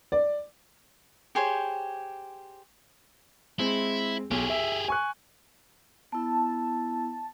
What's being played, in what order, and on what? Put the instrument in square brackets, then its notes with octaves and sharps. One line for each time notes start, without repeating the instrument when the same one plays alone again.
[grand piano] D5
[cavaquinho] G4 G#4 C5 C#5
[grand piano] G#3 C4 [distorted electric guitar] E4
[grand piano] B1 [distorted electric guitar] G4 G#4
[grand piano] E5
G#5 C#6 F#6
[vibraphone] B3 E4 [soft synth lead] A5